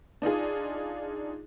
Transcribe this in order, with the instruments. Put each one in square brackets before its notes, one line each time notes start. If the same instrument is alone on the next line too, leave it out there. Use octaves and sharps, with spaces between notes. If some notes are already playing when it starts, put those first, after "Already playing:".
[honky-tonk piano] D4 D#4 F4 G#4